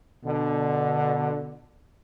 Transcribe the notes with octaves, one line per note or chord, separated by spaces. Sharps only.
B2 D3